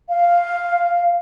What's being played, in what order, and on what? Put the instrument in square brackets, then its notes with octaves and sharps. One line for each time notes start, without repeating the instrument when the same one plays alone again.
[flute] F5